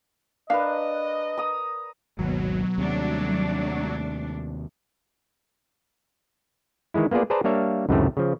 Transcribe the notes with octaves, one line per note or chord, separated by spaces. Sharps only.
D4 A#4 B4 D#5 F5
A#5 D#6
G#1 D#2 B2 F#3
D#2 C3 G3 A3 D4
D#3 E3 G#3 E4
A#3 B3 F4 G#4 D5
G#4 B4 C5 D5 A5 A#5
G3 A#3 D4 C#5 E5 F5
C#2 F#2 A2 C3 D#3 A3
C#3 F3